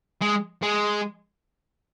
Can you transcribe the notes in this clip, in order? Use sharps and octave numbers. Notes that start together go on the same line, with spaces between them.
G#3
G#3